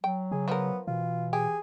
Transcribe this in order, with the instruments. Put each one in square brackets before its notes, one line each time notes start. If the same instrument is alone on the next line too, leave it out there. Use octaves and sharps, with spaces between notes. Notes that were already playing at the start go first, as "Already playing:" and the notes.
[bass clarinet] F#3 [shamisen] G5
[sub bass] C#3 [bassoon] G#4
[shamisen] F3 A#4 [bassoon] B3
[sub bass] B2 [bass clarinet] E3 [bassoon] F4
[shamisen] G4 [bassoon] G#4